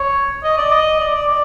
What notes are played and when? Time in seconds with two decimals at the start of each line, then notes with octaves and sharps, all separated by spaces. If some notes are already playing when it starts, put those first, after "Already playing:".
Already playing: C#5
0.44 D#5
0.58 D5
0.72 D#5
1.00 D5
1.15 D5
1.29 D5